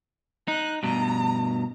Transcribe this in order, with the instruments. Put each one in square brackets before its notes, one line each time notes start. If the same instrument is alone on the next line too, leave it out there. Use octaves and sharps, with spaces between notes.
[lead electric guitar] D#4 [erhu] F#6
[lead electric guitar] G2 B2 [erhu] A#5